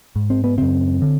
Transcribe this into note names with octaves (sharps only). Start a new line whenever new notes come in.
G#2
C4
B3
F#2 C#3 C4
D3